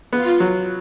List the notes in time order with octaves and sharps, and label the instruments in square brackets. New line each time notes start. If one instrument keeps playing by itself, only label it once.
[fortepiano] B3 [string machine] F4
[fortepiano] F#3